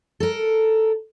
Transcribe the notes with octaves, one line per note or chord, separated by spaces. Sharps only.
A4 A#4